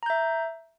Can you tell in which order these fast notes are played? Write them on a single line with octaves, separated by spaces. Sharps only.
A#5 G6 E5